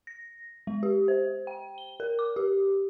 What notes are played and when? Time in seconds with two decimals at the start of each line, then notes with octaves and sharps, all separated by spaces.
0.07 A#6
0.67 G#3
0.83 G4
1.08 C5
1.47 G5
1.78 G7
2.00 A#4
2.19 D6
2.36 G4